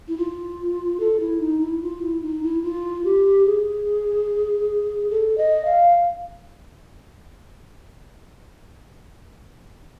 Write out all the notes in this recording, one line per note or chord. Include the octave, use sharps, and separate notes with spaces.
E4
F4
A4
E4
D#4
E4
F4
E4
D#4
E4
F4
G4
G#4
A4
D#5
F5